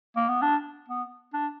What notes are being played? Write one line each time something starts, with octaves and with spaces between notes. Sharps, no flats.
A#3
B3
D4
B3
D4